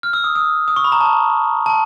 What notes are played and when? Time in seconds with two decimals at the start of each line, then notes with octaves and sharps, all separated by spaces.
0.03 F6
0.13 E6
0.24 D#6
0.35 D#6
0.68 D#6
0.76 C#6
0.84 B5
0.92 A#5
1.01 A5
1.66 A5